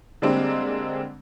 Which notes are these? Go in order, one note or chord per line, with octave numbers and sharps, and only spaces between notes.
D3 G3 G#3 A#3 C4 D4